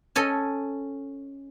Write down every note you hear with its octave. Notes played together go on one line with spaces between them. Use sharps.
C#4 A4 D#5 G#5